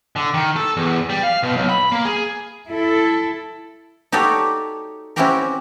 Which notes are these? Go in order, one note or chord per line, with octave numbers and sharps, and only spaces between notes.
D3
D#3
A4
E2
G3
F5
B2
B1
B5
A#3
G#4
E4 A4
D#4 F#4 G4 A4 C#5 D5
C4 C#4 E4 F#4 G4 A#4